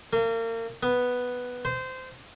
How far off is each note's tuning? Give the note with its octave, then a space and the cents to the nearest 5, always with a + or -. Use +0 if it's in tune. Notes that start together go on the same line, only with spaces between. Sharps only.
A#3 -35
B3 +0
C5 -20